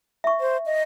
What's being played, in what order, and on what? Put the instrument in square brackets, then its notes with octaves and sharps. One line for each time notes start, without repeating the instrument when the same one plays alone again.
[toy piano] E5 C#6
[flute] C5
D#5